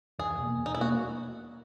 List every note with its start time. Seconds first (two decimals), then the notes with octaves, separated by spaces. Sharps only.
0.19 E2 G#4
0.38 B2 A#3
0.57 E2
0.66 D#4
0.75 E4
0.77 B2 A#3 F#4